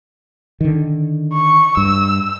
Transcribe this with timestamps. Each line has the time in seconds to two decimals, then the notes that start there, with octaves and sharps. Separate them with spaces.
0.61 D3 D#3
1.33 C#6
1.77 G2 E6